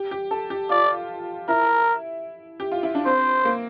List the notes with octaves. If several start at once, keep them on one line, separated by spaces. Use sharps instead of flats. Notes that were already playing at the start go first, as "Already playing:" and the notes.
Already playing: G4
G4
A4
G4
F4 D5
E4 A#4
G4
F4
E4
D4
C4 C5
A#3